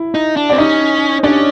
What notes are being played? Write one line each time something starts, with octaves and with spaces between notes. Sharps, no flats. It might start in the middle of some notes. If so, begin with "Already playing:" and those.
Already playing: E4
D#4
D4
C4 D5
C#4 D#4 D#5
C#4 D4 D5